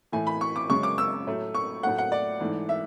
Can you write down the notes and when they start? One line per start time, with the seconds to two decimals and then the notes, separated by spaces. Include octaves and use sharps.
0.12 A2 E3 A3 G#5
0.27 B5
0.41 C#6
0.56 D6
0.69 F#2 C#3 G#3 C#6
0.83 D6
0.98 E6
1.27 A2 F#3 A3
1.55 C#6
1.83 A2 F#3 A3 F#5
1.98 F#5
2.12 D5
2.40 G#2 E3 A3
2.69 E5